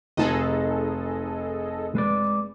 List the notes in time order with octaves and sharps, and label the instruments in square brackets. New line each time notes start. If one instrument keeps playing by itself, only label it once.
[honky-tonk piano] F1 D#4 [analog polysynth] G#4 A4 D#5
[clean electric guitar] G#3 B4 D5